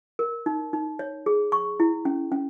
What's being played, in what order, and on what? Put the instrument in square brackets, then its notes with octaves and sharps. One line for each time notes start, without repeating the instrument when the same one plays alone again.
[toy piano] A#4
D#4
D#4
C#5
G#4
C#6
E4
C#4
C#4